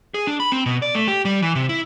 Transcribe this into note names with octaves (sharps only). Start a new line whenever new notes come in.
G#4
D4
B5
C4
B2
D5
A3
G4
G3
E3
C3
E4